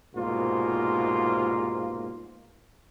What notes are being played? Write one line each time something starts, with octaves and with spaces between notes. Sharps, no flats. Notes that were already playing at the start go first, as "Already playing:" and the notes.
C2 G#2 B2 A#3 F4